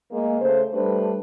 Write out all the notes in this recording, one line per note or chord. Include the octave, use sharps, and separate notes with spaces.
G#3 A#3
C#3 A3 C5
G3 A3 D4 B4 C5